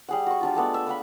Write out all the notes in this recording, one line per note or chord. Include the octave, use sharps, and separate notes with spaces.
G3 G#4 F#5
F#4 C#6
G3 D4 F4
G#3 A3 B3 D5
E5
B4 F5 F#5 B5